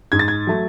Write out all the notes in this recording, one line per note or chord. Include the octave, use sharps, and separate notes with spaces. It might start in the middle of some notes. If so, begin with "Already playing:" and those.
G#2 G#6
A6
G#6
F#3 A3